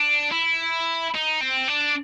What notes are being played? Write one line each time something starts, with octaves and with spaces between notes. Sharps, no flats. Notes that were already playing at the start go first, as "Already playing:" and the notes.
Already playing: D4
E4
D#4
C4
D4